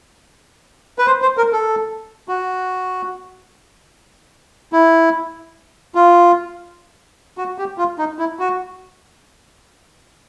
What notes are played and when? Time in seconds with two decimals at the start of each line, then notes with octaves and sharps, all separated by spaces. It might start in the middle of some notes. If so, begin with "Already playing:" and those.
0.99 B4
1.07 C5
1.22 C5
1.37 A#4
1.53 A4
2.28 F#4
4.73 E4
5.95 F4
7.38 F#4
7.58 G4
7.78 F4
7.98 D#4
8.19 E4
8.39 F#4